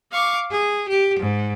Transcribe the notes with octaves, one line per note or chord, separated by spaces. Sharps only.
F5 C#6 D6
G#4
G4
G#2